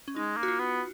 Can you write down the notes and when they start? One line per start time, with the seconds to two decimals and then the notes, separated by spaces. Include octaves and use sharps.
0.08 C#4
0.16 G#3 D#4
0.37 A#3
0.43 F#4
0.48 F4
0.59 B3